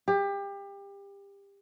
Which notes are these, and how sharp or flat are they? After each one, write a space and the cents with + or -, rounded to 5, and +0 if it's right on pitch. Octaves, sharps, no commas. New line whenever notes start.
G4 +25